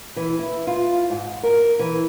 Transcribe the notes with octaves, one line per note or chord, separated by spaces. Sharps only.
E3
E4
F4
G#2
A#4
E3